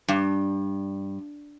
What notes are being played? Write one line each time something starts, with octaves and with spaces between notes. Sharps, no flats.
G2